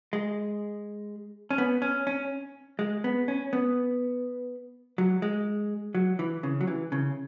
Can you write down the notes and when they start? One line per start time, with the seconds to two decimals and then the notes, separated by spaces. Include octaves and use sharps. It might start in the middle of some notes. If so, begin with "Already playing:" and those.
0.13 G#3
1.51 C#4
1.58 B3
1.82 C#4
2.07 C#4
2.79 G#3
3.04 B3
3.28 C#4
3.53 B3
4.98 F#3
5.22 G#3
5.95 F#3
6.19 E3
6.43 C#3
6.61 F#3
6.67 E3
6.92 C#3